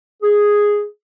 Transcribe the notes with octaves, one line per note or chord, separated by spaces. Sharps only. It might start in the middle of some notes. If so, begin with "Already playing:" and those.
G#4